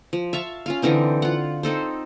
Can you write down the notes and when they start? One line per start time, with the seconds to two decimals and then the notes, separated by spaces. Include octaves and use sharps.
0.13 F3
0.33 E5 F5 A5 C#6
0.66 C#4 F4 F5
0.82 D3 E3 C4 D#4
1.22 F4 F#5
1.63 C4 D#4 A4 C5